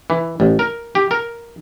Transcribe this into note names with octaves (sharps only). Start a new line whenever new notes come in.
E3
A1
A#4
G4
A#4